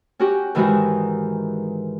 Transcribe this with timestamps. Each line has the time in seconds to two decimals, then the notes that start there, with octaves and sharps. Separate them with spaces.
0.19 C#4 F#4 G4
0.55 G#2 D#3 E3 G#3 E4 F#4